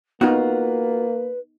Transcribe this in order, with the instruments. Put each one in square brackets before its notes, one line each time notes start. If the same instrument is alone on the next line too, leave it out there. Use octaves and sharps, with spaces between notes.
[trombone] A#3 [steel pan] B3 D#4 [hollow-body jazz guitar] F4 F#4 [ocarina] B4